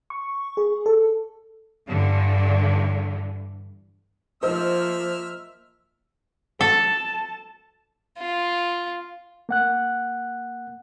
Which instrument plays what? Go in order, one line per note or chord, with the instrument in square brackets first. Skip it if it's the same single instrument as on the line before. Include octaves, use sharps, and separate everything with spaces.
[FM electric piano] C#6
G#4
A4
[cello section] G2 D3 E3
[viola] F3 A#3 [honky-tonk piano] C5 D#5 [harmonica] E5 E6 F6
[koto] A4 [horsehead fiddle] A5
[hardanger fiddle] F4
[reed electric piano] A#3 F#5 F#6